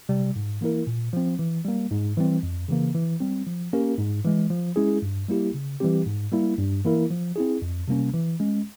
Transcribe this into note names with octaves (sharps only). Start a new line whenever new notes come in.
C3 G3
G#2
E3 A#3 E4 A#4
A#2
F3 C4
E3
G3 A#3
G#2
E3 G3 C4
F2
C#3 E3 A#3
E3
G3 C4
F3
A#3 C#4 G4 A#4
G#2
E3 G#3
F3
G#3 C#4 E4 G#4
G2
G3 A#3 E4 G4
C#3
E3 G3 C4 G4
G#2
G3 A#3 E4
G2
E3 A#3 E4 A#4
F3
C4 E4 G#4
F2
C3 G3 A#3 C#4
E3
G#3 C#4